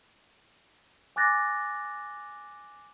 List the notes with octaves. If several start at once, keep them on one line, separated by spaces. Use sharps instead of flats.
G#5 D6 F#6 A6 A#6